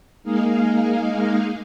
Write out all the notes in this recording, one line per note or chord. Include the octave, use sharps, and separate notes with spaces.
G#3 A#3 D#4 G#4 F5